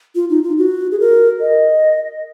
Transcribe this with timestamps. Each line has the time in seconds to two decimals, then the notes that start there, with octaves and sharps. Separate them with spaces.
0.15 F4
0.30 D#4
0.43 F4
0.58 F#4
0.92 G#4
1.00 A#4
1.41 D#5